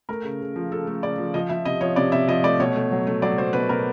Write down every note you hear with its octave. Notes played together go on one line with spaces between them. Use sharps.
A3 A#4
C#3
C#3
F3
C#3 A4
A3
C#3 D5
F3
F3 D#5
F3 E5
C3 D#5
F3 C#5
C3 D5
C3 E5
F3 D#5
A3 D5
B2 C#5
A3
F#3
A3
F#3 D5
F#3 C5
B2 B4
B2 A#4